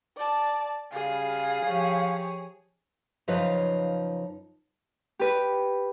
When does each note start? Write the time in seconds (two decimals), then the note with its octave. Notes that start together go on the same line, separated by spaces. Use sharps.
0.17 D5 A5
0.92 C#3 G3 G#4 F5
1.64 F3 G4 C#5
3.28 F#2 C#3 F3 D#4 B4 F5
5.19 G4 B4